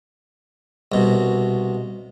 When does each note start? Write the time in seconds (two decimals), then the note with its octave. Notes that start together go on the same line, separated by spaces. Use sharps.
0.92 C2 B2